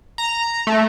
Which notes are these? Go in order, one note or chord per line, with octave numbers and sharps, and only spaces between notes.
A#5
A3